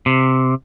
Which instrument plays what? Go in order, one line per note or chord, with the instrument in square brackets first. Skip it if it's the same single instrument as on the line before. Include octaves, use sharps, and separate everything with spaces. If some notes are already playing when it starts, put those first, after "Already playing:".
[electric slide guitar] C3